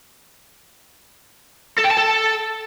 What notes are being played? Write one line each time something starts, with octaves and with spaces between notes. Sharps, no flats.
A4
G5
A5
A4